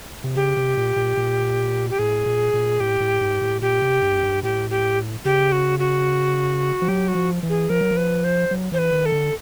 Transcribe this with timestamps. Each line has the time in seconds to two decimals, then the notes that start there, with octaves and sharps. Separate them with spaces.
0.24 C3
0.35 C#3 G4
0.57 C3
0.77 A#2
0.96 A#2
1.17 A#2
1.90 G4
1.99 A2 G#4
2.26 A#2
2.54 A#2
2.80 A2 G4
3.00 A2
3.21 G#2
3.41 A2
3.61 A#2 G4
3.82 C3
4.02 G2
4.17 F#2
4.23 G2
4.43 A2 G4
4.70 G4
5.25 C#3 G4
5.52 F#4
5.79 F#4
6.82 F3
6.88 F#3 G4
7.08 F#4
7.15 F3
7.43 E3
7.49 G#4
7.69 F3 A#4
7.81 F#3
7.91 F3
7.97 B4
8.24 C5
8.51 F#3
8.72 E3 C5
8.78 B4
8.92 D#3
9.06 A4
9.12 D3